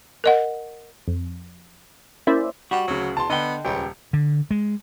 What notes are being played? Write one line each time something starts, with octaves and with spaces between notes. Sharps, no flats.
A#4 D#5 F#5
F2
A#3 C#4 E4 C5 D5 E5
G3 F#4
D2 C#3 F#3
E2 A5 C6
D3 B3 D#5 G5
D#1 C#2 G4
D3
G#3